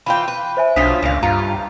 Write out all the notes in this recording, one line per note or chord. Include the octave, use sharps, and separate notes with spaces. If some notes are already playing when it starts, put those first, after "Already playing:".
E3 F4 G5 B5
B4
C5 E5 G#5
B1 F3 F#3 D4 F4 D#6 B6
C#2 A#2 F5
G2 F4 A#5